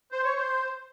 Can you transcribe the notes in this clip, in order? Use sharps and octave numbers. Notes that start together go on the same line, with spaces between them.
C5
C#5
C5